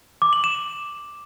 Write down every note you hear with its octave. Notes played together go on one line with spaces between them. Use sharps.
D6
F#7
E7